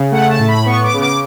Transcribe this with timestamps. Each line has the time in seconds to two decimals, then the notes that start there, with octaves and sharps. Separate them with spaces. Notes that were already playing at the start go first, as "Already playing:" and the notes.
Already playing: C#3
0.12 A3 F#5
0.30 A5
0.39 A2
0.48 B5
0.66 B3 C#6
0.83 D6
0.93 C#3
1.02 D6